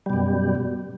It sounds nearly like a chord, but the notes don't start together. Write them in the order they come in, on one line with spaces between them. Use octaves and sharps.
G3 B2 F#2